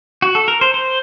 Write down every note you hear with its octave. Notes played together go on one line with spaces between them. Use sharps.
F#4
A4
A#4
C5
C5